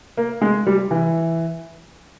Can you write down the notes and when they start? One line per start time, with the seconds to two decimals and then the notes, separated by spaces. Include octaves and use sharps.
0.17 A#3
0.42 G#3
0.67 G3
0.91 E3